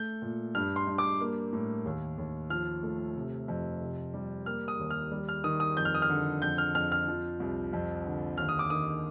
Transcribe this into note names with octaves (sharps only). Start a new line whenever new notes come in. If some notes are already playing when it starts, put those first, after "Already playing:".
Already playing: A3 G6
A#2
G2 F6
C6
G2
D6
A#3
A2
D#2
D#2
F3 F6
A3
C3
F2
C3
G3
A#3 F6
D#6
D#2
F6
G3
F6
D#3 D#6
D#6
F2 G6
F6
D#6
F6
D3
F2 G6
F6
F2 F6
F6
F3
C2
F2
D3
D#2 F6
D#6
D6
D#3 D#6